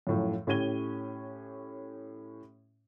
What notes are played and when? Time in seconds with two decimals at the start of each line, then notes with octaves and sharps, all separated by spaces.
0.07 F#2 A2 F3
0.47 A2 C#4 G4 G#6 D#7 G7